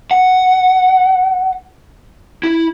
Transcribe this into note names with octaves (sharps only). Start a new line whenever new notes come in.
F#5
E4